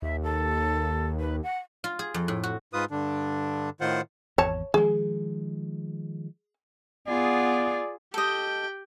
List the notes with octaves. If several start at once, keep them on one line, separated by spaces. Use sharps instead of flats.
D#2 E5
A4
B4
F#5
F4
G#4
F2
A2
F#4
G#2 F4 B4 D#6
G2 D3 D4
A2 D#3 F4 C5 F#5
G#1 E2 C#5 A5
D#3 F3 G#3 G#4
B3 F4 G#4 D5
G4 A4 D#5 G5